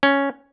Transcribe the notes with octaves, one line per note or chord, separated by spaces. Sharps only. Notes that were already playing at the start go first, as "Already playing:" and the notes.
C#4